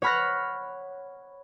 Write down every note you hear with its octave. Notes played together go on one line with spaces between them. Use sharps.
C#5 F#5 B5 F6 F#6 A#6